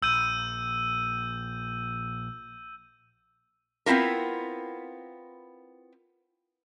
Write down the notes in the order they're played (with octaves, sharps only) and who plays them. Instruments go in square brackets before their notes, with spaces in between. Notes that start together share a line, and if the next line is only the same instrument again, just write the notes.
[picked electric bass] A#1 [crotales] E6 G6 D#7
[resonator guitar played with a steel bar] B3 C4 E4 F4 A#4